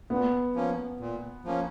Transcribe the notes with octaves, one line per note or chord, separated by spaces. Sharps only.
A#2 B3
F3 A#3 C#4
A#2
F3 A#3 C#4